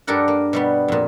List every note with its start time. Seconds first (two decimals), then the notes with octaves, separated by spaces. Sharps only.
0.07 G2 D4 G4 A4 A#4 F#5
0.28 A#3
0.53 B2 G3 B3
0.88 F2 A#2